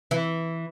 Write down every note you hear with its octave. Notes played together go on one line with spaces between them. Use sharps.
E3